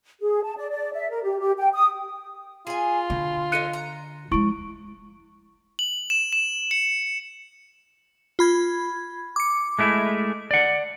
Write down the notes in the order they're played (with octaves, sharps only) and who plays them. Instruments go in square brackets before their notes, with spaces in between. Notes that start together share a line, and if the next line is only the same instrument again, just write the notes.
[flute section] G#4
A5
D5
D5
E5
A#4
G4
G4
G5
D#6
[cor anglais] F4 [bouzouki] G#4 G#5
[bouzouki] B2 [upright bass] D3
[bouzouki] D#4 A4 C5 [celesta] F#6 C#7 D#7
[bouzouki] A#5
[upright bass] F3 G#3 [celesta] E4 C#6 D7
[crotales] F#7
E7
E7
C#7
[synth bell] F4 B5 G#6
D6 C#7
[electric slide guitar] G#3 A3 E4
D5 F#5